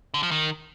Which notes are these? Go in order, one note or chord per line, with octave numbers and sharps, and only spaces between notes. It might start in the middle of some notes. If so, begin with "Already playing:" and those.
D3
F3
D#3